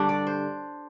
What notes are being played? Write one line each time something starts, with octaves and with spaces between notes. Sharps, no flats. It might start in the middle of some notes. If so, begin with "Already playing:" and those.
Already playing: G2 D3 G3 D4
D5
C5